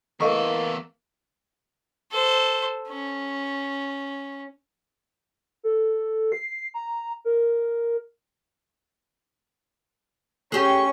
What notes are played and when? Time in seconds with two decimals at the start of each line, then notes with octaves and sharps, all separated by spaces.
0.20 E2 E3 A#3 A4 D#5 C#6 D6
2.12 A4 C5
2.88 C#4
5.63 A4
6.32 C7
6.74 A#5
7.25 A#4
10.52 C#4 G4 G#4 C#6